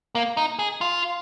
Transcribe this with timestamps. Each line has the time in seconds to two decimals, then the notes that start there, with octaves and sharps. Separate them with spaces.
0.15 A#3
0.37 D#4
0.59 G#4
0.81 F4